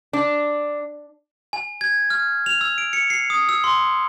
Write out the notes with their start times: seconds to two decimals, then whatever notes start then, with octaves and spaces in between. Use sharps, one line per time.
0.13 D4
1.53 G#5
1.81 G#6
2.10 F6
2.46 F7
2.61 E6
2.78 D7
2.93 C#7
3.10 C7
3.30 D#6
3.49 E6
3.64 C6